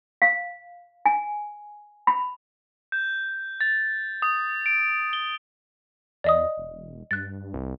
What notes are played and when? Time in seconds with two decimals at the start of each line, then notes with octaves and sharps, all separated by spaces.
0.22 F5
1.06 G#5
2.07 B5
2.92 G6
3.61 A6
4.22 D#6
4.66 D7
5.13 G7
6.24 E2 D5 D#5 D#6
6.57 E1
7.11 G2 F#6 A6
7.54 C2